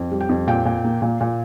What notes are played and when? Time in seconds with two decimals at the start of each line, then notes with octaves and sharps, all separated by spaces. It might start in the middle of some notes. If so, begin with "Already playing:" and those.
Already playing: F2
0.12 G3
0.21 G5
0.29 F2
0.47 A#2 G5
0.65 A#2
0.84 A#3
1.02 A#2
1.21 A#2